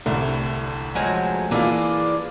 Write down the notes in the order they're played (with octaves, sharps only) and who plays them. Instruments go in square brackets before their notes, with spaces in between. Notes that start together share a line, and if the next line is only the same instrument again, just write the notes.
[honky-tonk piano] C2 A2 D3
[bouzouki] F3 F#3 G#3
[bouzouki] E3 D4 G#4 [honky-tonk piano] A#3 F4